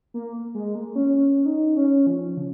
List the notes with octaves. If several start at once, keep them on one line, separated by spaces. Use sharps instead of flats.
A#3
G#3
A#3
C#4
C#4
D#4
C#4
F3
C#3